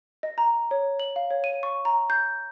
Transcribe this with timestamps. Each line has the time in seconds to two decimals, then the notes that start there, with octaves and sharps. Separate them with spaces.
0.23 D#5
0.38 A#5
0.71 C#5
1.00 F#7
1.16 F5
1.31 C#5
1.44 D#7
1.63 C#6
1.85 A#5
2.10 G6